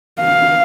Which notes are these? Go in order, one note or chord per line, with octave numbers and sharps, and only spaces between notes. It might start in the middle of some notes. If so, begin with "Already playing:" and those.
F5